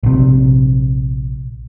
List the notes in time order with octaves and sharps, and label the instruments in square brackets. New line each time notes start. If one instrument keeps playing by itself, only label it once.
[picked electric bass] A#1 C3